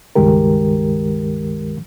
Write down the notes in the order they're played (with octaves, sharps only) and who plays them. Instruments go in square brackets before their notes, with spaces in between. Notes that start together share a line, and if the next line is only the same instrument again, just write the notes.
[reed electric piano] C#2 G2 D#3 G#3 G4 A#4